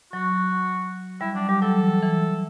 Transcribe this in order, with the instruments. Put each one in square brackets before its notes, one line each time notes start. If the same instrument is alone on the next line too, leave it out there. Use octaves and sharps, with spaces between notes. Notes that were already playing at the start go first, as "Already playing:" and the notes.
[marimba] F#3 [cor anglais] F#4
[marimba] G3 [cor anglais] E4
[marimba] F#3 [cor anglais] D4
[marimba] G3 [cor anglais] G4
[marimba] F#3 [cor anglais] A4
[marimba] E3
E3